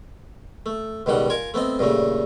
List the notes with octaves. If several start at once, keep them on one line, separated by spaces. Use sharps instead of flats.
A3
C#2 B2 D#3 G3 F#5
F4 A#4 G#5
A3 B3 C4 D#5
G2 A#2 C#3 A3